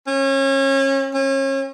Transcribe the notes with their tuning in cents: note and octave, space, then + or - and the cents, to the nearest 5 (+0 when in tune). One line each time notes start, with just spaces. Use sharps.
C#4 -30
C#4 -35